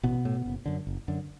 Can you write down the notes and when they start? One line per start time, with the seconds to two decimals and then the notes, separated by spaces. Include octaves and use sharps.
0.03 A1 B2 B3
0.25 A2
0.46 F#1
0.66 F#2 D3
0.87 F#1
1.08 F#2 D3